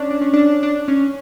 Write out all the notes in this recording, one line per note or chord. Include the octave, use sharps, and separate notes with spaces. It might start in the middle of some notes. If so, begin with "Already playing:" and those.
Already playing: C#4 D4
D4
C#4
D4
D4
C#4